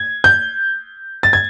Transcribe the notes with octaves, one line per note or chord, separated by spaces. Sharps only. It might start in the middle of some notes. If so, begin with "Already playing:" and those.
Already playing: G#6
G6
A6
G#6